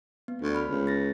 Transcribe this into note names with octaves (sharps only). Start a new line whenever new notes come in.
B3
D2
B5 F6
C#2
A6 A#6